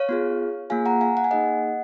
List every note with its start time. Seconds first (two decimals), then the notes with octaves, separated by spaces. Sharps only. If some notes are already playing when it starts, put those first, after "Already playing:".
Already playing: C#5 F5
0.09 B3 F4 G#4
0.70 A#3 F4 G#4 F5 G#5
0.86 F#5 A#5
1.01 F5 G#5
1.17 F#5
1.24 G#5
1.31 A#3 D#4 G#4 D#5 F#5